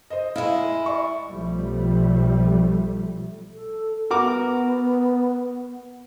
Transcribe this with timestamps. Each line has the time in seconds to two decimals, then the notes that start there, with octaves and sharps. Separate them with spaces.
0.10 C5 D#5
0.36 G#3 E4 D#5 F5
0.86 D5 C#6
1.29 B1 F3 G3 A3
3.53 A4
4.11 B3 F#4 A#4 D6